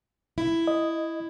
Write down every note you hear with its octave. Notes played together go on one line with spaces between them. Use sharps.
E4
D#5